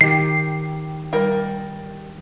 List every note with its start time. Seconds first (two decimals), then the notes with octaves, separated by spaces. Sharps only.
0.01 D#3 G4 C7
1.13 G3 A#4 G5